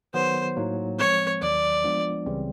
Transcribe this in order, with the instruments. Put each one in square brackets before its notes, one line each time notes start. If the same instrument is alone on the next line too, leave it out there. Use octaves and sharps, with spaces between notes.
[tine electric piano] D#3 F#3 B3 [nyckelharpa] C5
[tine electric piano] A2 F#3 A#3 D#4
[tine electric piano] F3 G#3 C4 [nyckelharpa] C#5
[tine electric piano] D#2 D#3 F#3 [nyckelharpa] D5
[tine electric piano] F3 G#3 B3 D4 F4
C#2 C#3 E3 G3 C4